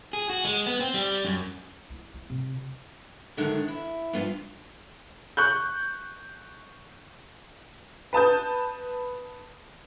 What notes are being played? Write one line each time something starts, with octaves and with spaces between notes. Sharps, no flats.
G#4
F#4
G#3
B3
C4
G3
F#2
E4
E4
C3
F#2 D3 D#3 G#3 D4
E4
G2 F3 B3 F4 F5
C#6 F#6 G6
B4 A5 D#6 G6